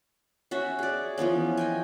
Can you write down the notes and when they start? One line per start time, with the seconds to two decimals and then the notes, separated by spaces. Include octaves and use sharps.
0.51 C#4 F#4 E5
0.79 G#4 D5
1.18 E3 F3 B3 C#4
1.57 D#5 G5 G#5